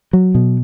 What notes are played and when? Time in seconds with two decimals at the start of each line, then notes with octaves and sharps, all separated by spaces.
0.13 F#3
0.35 B2